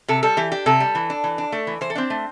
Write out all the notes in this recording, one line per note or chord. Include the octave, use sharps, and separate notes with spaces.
C3 A4
G3 A4
E3 G4
D4 G4
C3 A4
G3
E3
D4
E3
D4
A3
E3
E3 C5
A4
C4 D4 C5
A3